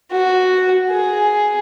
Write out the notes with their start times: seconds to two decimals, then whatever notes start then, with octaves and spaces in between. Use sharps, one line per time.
0.12 F#4
0.90 G#4